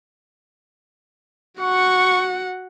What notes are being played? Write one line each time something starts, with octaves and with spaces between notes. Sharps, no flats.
F#4 F#5 C#6